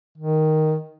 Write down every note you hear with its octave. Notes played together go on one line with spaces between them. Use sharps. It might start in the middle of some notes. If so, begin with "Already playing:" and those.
D#3